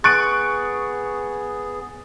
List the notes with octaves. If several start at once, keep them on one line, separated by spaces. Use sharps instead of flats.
B3 G#4 C#6 F#6 A6 D7